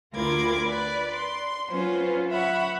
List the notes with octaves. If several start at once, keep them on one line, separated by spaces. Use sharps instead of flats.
D2 F4 A#4 B5 D6 G#6
B4 D5 B5
C6
F#3 C#4 F4 B4 C5
E5 F#5 B5 C#6